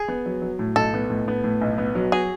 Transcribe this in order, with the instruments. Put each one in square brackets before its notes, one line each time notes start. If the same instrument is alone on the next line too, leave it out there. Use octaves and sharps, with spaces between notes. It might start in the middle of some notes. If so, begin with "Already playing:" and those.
Already playing: [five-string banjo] G#4
[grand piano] B3
F#3
F#3
A2
[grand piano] B1 [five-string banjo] A4
[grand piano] B3
A2
B3
A2
B1
B3
F#3
[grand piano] F#4 [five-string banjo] G#4